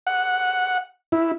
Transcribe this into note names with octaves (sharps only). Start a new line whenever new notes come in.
F#5
E4